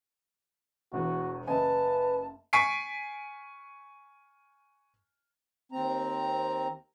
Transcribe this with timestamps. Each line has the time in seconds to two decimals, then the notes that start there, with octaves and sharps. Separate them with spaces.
0.93 E1 E2 F#4
1.47 F#1 B4 D#5 G#5 A5
2.53 G#5 C#6 B6 C7 D7
5.72 D#2 C4 A#5